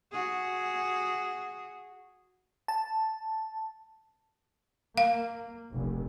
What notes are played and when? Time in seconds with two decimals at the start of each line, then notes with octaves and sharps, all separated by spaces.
0.12 F#4 G#4
2.68 A5
4.97 A#3 F5
5.72 F1 A#1